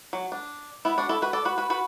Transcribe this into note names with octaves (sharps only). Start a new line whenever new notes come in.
F#3
D4
B3 E4
D4 F#4
E4 A4
F#4 B4
A4 D5
F#4 B4
F#4 B4
F#4 B4